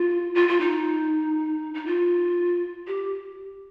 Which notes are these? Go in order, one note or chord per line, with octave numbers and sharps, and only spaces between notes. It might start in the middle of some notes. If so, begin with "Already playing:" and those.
Already playing: F4
F4
F4
D#4
D#4
F4
G4